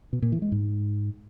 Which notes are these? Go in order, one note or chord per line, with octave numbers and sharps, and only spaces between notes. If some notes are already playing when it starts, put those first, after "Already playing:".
B2
A#2
E3
G#3
G#2